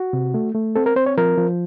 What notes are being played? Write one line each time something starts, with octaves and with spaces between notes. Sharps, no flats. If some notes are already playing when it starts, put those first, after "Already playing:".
Already playing: F#4
C3
A3
A3
C4 A4
A#4
C4 C5
C#5
F3 A#4
F3